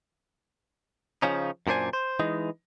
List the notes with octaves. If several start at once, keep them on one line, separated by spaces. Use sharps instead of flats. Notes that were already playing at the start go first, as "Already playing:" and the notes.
C#3 F3 C#4 D#4
F#2 A#2 D4 C5 G#5
C5
E3 G#3 D#4